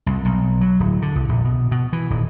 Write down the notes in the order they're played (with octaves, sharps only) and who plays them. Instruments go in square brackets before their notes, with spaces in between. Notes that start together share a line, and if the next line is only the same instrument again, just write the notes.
[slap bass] C2
B1
F#3
D1
D3
C2
A#1
B2
B2
E3
D#1